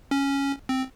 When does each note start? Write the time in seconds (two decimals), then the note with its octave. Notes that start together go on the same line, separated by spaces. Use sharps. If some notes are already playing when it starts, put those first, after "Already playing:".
0.11 C#4
0.69 C4